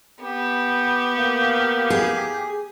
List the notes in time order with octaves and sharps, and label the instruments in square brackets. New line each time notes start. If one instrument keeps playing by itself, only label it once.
[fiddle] B3 [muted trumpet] G4
[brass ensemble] A#3 F5
[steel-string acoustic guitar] G#4